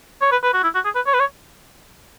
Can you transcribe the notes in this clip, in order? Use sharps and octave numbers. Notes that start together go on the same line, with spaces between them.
C#5
B4
B4
F#4
E4
F#4
G#4
B4
C#5
B4
C#5